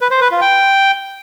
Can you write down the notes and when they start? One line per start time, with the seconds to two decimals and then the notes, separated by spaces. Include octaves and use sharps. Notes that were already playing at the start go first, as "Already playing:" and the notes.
0.01 B4
0.11 C5
0.21 B4
0.31 F4
0.41 G5